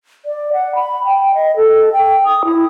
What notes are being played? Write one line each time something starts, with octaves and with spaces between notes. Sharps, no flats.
D5
F#5
B5
G5
D#5
A4
G5
D#6
E4